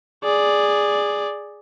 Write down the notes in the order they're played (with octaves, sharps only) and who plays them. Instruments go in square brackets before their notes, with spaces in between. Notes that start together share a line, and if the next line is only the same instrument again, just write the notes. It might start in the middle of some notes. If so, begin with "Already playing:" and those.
[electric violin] G#4 D5